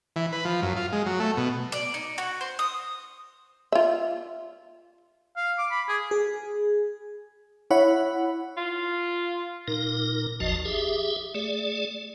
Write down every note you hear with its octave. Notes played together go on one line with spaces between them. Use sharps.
E3
B4
F3
F#2
F4
G#3
F#3
A3
B2
D5
D#4
F#4
C5
D#6
F4 E5
F5
D6
B5
G#4
G#4
E4 C#5 F#5 B5
F4
A#2 D#4 A#4
G1 D#2 F3 F#4 D#5 A5
G4 G#4 E5
A3 G#4 D5